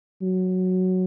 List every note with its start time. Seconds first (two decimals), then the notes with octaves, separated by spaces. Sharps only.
0.22 F#3